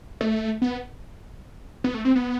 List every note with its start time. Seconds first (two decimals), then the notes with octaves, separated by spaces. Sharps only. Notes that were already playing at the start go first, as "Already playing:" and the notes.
0.21 A3
0.62 B3
1.84 B3
1.94 A3
2.05 C4
2.15 B3